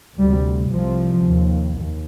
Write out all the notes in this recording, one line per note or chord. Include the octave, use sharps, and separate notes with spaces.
D2 C3 G3
C2 C3 F3
D#2
D#2